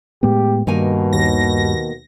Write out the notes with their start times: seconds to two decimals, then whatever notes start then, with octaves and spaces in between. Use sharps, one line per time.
0.23 A2 G#3 B3 G4
0.67 G2 B2 D#3 A#3 G#5
1.13 D#2 A#6